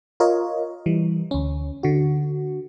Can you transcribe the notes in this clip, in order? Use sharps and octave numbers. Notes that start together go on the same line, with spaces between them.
F4 A#4 C#5 D#5
E3 G3
D2 C#4
D3 F#4